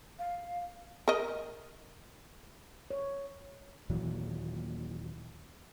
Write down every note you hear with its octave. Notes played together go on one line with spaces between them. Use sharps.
F5
A#4 D#5
C#5
D#2 A#2 E3 F#3